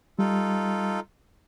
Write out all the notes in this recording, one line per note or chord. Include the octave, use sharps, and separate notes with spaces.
G3 D#4 F4 A4